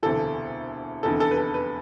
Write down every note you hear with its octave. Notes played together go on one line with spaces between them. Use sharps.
E1 D2 C3 E3 A4
F1 E2 D3 A4
A4
B4
A4
B4